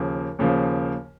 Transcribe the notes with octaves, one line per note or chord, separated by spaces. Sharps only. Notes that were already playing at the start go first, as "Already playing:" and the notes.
Already playing: D#2 C#3 F3 A#3
D#2 C#3 F3 A#3